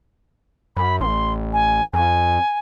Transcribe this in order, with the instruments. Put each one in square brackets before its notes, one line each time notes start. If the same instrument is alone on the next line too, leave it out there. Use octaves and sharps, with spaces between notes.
[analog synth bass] F#2 [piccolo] B5
[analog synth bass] A1 [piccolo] C6
[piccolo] G#5
[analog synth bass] F2 [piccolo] G#5